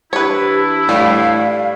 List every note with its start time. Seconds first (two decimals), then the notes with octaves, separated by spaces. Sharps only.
0.13 E3 D4 E4 G4 B4 C#5
0.89 A2 G3 F5